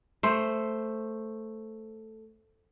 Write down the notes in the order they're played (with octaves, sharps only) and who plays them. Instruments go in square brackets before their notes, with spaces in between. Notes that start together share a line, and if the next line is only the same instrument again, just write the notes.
[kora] A3 C5